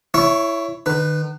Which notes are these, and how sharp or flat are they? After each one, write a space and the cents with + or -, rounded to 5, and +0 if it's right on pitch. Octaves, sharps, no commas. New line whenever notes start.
E4 +15 C#5 +10 C#6 -25
D#3 -40 B4 +0